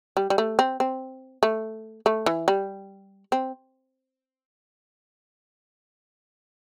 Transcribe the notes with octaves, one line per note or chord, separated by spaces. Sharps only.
G3
G3
A3
C4
C4
A3
A3
E3
G3
C4